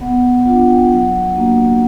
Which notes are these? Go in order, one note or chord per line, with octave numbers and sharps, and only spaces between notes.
B3 F#5
D4 F4 F#5
G5
F#3 F#5
A#3 D4 F#4